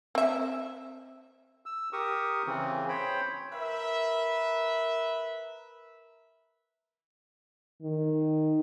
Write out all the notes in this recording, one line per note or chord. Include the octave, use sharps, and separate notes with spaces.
C4 E5
E6
G4 A#4 C#6 D#6
C#3 E3 C4
C5 C#5 G5 B5
A#4 B4 E5
D#3